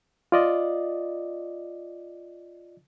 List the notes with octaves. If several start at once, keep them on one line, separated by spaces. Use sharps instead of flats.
F4 D5 D#5